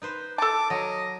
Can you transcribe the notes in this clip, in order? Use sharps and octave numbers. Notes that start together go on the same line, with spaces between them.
D#4 B4 C5
A4 A5 D6
F#3 D#5